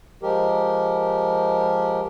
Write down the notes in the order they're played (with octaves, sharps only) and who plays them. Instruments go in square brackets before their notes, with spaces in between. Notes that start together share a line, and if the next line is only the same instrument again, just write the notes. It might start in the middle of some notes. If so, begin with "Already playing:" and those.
[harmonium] F3 G#3 G4 A#4